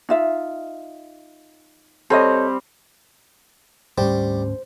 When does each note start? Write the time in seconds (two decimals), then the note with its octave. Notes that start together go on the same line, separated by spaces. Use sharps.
0.09 D#4 F4 E5
2.10 G3 C4 A4 C#5 D#5
3.98 D2 G#2 G3 C#4 C5